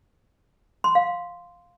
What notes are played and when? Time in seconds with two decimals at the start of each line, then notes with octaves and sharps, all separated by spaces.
0.84 C6
0.95 F5
1.06 F5